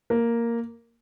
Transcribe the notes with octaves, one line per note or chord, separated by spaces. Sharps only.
A#3